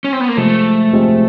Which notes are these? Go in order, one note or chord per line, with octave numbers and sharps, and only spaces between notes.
C#4
C4
B3
A#3
C3 F3 G#3 A3
C3 F3 G#3